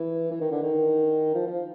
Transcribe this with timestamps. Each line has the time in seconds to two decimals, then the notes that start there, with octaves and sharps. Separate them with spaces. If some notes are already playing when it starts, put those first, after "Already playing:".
Already playing: E3
0.31 E3
0.41 D#3
0.51 D3
0.62 D#3
1.34 F3
1.47 F3